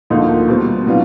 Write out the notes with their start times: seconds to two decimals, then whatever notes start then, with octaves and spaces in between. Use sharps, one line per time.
0.10 D2 D3 F3 A#3 D#4
0.47 B2 G3 C4
0.86 A2 F#3 B3 D4 F4